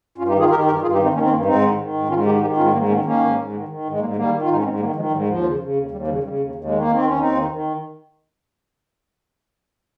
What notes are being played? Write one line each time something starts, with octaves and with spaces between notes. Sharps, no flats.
G2 C#4 F4
D#4 G4
D#3 F4 G#4
D#3 G4 A#4
G2 G4 A#4
G2 F4 G#4
D#4 G4
D#3
C4 D#4
D#3 A#3 C#4
C4
G2 A#3 C#4
G#2 C4 D#4
D#3
D#3
G#2
G#2 C#4 F4
D#3 D#4 G4
D#3 D#4 G4
G#2 C#4 F4
G#2 G3 A#3
D#3 A#3 C#4
D#3 A#3 C#4
G#2
G#2
D#3
D#3
G#2
G#3
G#2 G3 A#3
D#3 G3 A#3
D#3
F4
G#2 D#4
C#4
G#2 G#3 C4
D#3 G3 A#3
D#3 F3 G#3
G#2 G3
D#2 F3
C#3
C#3
D#2
D#2 G3
C#3 G3
C#3 G3
D#2
D#2
G#3
D#3
A#3
D#3 C4
D#2 C#4
D#2 C4 D#4
D#3
D#3